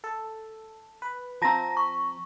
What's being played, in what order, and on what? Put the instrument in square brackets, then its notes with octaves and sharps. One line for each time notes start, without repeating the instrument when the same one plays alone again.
[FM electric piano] A4
B4
[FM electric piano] F3 C4 [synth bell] A5 A#5 A#6
[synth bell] C#6